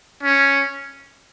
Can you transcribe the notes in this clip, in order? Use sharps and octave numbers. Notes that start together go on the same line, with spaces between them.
C#4